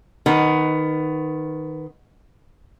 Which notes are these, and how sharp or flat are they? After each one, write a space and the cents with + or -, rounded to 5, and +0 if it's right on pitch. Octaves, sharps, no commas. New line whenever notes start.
D#3 +0 B3 +15